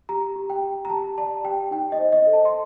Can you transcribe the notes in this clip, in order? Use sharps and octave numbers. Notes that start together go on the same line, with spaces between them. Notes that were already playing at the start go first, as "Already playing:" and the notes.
G4 A#5
G4
G5
G4
A#5
G4 A5
D5 A5
G4 G5
D#4 G5
D#5
C5
D#5
A4
A5
C6